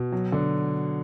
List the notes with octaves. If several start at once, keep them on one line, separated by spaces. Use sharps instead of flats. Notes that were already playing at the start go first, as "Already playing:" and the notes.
Already playing: B2
F#3
D3